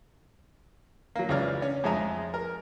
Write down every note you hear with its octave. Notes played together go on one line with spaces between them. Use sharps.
F#3 A#3
C#2 C#3 E3 C#5 D5 F5
C#4
F2 G#3 E5 G#5 A#5
A#4